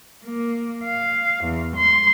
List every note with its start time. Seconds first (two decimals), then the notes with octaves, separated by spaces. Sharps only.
0.24 A#3
0.83 F5
1.44 E2
1.75 C6